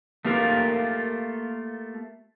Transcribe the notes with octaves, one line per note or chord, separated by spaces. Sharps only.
A3 A#3 F4 G4 A#4